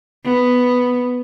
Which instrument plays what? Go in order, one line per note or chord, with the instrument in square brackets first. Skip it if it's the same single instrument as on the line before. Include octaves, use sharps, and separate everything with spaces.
[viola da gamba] B3